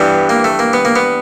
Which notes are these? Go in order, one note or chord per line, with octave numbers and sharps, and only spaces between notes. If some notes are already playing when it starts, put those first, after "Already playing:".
Already playing: G2 E3 G3 B3
A#3
A3
A#3
B3
A#3
B3